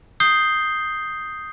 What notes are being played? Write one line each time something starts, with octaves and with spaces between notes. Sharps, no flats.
D#6 G6 C7 G7